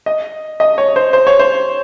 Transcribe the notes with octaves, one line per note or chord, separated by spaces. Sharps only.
D#5
D#5
C#5
C5
C5
C#5
C5